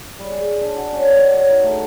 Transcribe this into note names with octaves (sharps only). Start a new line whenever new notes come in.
G3
G#4
D4
F#4
C#4
A#4
D5
C#5
D#4
A3